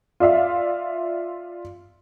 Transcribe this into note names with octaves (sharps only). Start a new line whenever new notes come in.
F4 D5 E5 F5